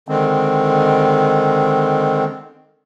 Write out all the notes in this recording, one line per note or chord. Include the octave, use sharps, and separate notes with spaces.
D3 D#3 G#3 C4